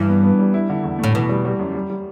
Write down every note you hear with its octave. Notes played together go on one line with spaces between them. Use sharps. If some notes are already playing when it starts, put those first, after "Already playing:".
Already playing: G2 E3
B3
B3
G3
E4
D3
E2
A2 A3
B2 E3
G3
G3
F#2
G3
G3